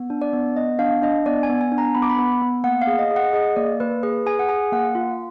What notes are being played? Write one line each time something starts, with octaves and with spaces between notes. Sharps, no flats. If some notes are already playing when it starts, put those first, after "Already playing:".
Already playing: B3
D4
D5
B3
B3 D#5
D4 F5
D4 D#5
B3 D5
G#5
B3
G#5
D4
A#5
B3 B5
D6
B5
B3
B3
A#3 F#5
F5
G#4
D#5
G#4
F#5
G#4 D#5
A#3 D5
A#3 B4
G#4 B4
G#4 G#5
F#5
G#4 G#5
A#3 F#5
F4